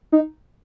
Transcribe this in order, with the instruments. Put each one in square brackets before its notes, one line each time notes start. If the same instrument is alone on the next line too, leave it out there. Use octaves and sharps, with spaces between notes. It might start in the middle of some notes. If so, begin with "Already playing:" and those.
[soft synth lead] D#4